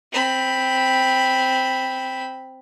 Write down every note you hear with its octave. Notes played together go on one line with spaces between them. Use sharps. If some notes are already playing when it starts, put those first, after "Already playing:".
C4 B5